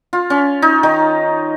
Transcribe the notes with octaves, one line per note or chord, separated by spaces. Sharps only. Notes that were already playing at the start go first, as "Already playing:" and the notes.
F4
C#4
D#4
D#3